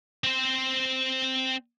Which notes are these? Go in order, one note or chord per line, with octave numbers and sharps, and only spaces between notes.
C4 C5